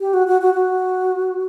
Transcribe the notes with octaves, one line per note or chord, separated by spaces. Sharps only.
G4
F#4
F#4
F#4
F#4